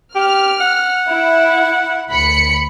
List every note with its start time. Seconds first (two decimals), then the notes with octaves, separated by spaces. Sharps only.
0.15 G4 F6
0.61 F#5
1.07 E4
2.09 D2 B5 C#7